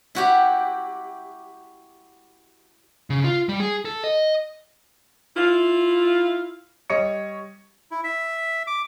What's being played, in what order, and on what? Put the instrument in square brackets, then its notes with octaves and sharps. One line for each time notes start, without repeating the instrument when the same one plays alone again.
[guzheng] E4 F#4 G4
[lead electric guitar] C#3
F4
G3
G#4
A4
D#5
[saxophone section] E4 F4
[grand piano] G3 C#5 D#5 C#6 C#7
[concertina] E4
E5
D6